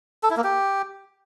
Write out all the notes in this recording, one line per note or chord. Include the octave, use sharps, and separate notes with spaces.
A4
E4
A#3
G4